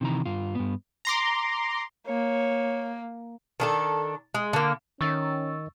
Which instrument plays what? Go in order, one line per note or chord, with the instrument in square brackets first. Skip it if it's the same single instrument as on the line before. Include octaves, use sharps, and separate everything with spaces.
[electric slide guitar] C3 D#3 E3 A#5
G2 F4
G2 B3
[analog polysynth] A#5 C6 D6
[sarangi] A#3 [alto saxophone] C#5
[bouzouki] D#3 D4 A4
G#3
D3 A#3
[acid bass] D#3 [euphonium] C#4 [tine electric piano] C#6 E6 A6